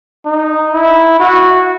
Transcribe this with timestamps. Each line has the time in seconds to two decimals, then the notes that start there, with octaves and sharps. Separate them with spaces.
0.26 D#4
0.73 E4
1.20 F#4